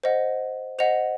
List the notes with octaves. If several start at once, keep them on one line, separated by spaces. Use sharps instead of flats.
C5 D#5 F#5
C5 D#5 F#5 F7